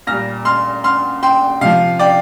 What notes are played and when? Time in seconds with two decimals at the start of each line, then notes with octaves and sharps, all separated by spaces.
0.07 A#2 G3 F6 A#6
0.45 C6 F6
0.84 C6 F6
1.23 G5 C6
1.61 C3 F3 F5
1.99 D5 G5